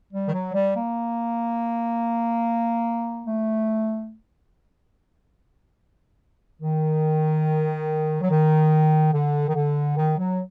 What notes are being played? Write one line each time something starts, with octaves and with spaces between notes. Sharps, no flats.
G3
D#3
F#3
G3
A#3
A3
D#3
F#3
D#3
D3
D#3
D3
D#3
F#3